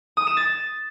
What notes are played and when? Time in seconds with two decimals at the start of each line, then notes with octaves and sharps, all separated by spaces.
0.17 D#6
0.27 E7
0.37 A6